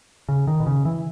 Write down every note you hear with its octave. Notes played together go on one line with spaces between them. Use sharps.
C#3
D#3
B2
C#3
E3